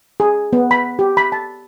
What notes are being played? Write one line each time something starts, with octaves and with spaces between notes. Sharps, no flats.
G#4
B3
B5
G4
B5
A5